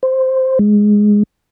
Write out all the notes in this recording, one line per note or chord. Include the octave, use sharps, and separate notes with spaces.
C5
G#3